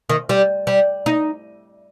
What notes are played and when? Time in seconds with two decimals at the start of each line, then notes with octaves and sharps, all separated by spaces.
0.10 D#3
0.29 G3
0.67 G3
1.06 D#4